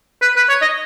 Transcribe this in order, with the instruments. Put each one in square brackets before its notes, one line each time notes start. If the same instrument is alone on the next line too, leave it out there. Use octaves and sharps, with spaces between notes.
[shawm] B4
B4
C#5
D#5